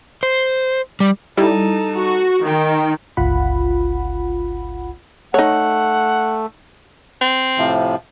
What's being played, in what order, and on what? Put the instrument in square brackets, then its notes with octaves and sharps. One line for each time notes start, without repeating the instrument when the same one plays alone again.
[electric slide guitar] C5
G3
[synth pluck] G3 E4 [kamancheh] D#4 A4
[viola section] F#4
[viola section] D#3 [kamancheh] G5
[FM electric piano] G1 C#2 F4 F#5 B5
[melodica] A3 [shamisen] D#4 C#5 [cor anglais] F#5
[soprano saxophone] C4
[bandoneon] A2 C3 F3